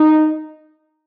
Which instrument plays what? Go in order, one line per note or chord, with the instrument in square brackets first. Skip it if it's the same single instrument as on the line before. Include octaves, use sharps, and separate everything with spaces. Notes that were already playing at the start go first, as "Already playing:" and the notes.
Already playing: [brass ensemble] D#4